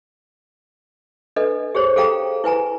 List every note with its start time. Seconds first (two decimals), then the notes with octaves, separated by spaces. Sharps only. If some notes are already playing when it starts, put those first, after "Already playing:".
1.36 D4 A4 B4 D#5
1.75 G4 G#4 C5 C#5
1.96 G#4 A4 F5 G5 A#5
2.44 E4 B4 G#5 A#5